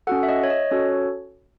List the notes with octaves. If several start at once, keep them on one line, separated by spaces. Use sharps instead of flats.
C#4 F#4 A4 F#5
E5
D#5
C#5
D#5
C#4 F#4 A4 C#5